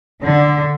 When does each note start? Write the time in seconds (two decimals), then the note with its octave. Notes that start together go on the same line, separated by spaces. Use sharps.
0.23 D3